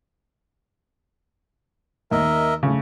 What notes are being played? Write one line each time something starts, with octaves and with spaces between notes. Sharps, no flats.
D#2 A#4 D#5 E5
C#3 A3